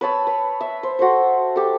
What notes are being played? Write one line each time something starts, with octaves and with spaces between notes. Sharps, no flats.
B4 C#5 A5 E6
B4
E5
C5
F#4 A4 C5
G4 A4